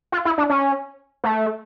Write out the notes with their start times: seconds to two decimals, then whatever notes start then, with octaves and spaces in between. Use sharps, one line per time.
0.12 F4
0.25 E4
0.38 D4
0.50 C#4
1.24 A3